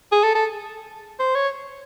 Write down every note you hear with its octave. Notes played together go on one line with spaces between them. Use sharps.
G#4
A4
A4
C5
C#5